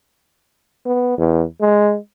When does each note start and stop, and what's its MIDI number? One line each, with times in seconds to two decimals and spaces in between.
0.86 1.16 59
1.18 1.44 40
1.61 1.97 56